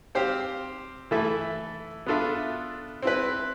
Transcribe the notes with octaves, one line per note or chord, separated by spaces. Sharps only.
C4 G4 C5 F5
E3 A3 E4 A4 E5
B3 D4 F4 A4 E5
C4 E4 B4